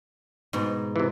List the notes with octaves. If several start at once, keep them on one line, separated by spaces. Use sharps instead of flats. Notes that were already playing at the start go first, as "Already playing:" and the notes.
G#2 B2
C3 E3